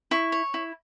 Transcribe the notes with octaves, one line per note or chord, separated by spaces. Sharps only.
E4 C#6
C#5
E4